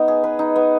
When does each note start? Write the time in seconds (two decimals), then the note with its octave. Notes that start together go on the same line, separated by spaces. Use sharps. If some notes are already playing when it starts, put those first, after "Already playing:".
Already playing: B3 D#4
0.08 G#4
0.24 B4
0.39 D#4
0.56 B3